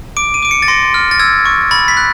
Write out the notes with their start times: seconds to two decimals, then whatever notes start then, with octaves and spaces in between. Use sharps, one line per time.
0.17 D6 D7
0.34 D#7
0.43 D6 D7
0.51 C#7
0.62 A6
0.68 C6 A#6
0.94 F6
1.11 A6
1.19 E6 G#6
1.45 C#6
1.71 B5 A6
1.88 B6
1.97 F#6